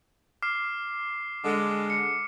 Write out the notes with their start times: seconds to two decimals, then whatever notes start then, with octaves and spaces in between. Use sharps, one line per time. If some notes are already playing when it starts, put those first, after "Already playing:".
0.42 D6 F6 C7
1.45 D3 G#3 D6
1.90 C#7